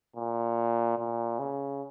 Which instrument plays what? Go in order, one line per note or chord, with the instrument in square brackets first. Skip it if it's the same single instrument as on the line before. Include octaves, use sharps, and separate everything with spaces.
[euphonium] A#2
A#2
C#3